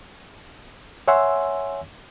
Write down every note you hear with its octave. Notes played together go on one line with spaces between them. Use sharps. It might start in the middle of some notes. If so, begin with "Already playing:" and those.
C#5 E5 F#5 G#5 C6 E6